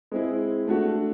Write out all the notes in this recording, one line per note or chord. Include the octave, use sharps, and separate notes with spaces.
G#3 C4 E4 G#4
A3 D4 F#4